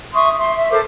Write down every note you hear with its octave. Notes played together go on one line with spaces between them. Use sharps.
E5 C6 C#6 D#6
E5 C6
E5
A4 A#4 C5 D6